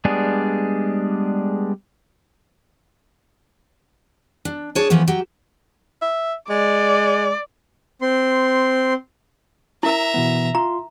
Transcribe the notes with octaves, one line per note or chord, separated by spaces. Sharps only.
G3 G#3 B3 D4 G#4
D4
D4 G#4 C#5 A5
E3 F3 A3 B3
F#3 G4
E5
G#3 D5
C4 C6
E4 A#4 E5 A#5
B2 E3 B3
F4 A#5 C6